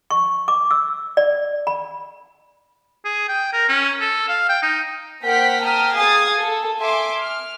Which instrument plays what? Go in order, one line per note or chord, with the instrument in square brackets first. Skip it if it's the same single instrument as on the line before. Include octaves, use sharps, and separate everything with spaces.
[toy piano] C#6
D6
E6
D5
B5
[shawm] G#4
G5
A#4
C#4
A4
F5
G5
D#4
[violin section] A#3 C5 F#5 G5 F6 B6
G5 A5 A#5 D#6 F6
G#4 F5 D#6 G#6 A6 C7
A4
E5 G#5 C6 D6
F6